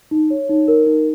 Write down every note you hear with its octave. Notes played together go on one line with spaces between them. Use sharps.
D#4
C#5
D#4
A#4
D#4